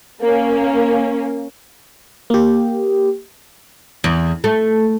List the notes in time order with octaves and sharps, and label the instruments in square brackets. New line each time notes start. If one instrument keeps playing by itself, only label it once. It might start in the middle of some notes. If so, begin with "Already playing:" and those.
[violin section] A#3 C#4
[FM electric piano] A#3 G4
[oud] E2
A3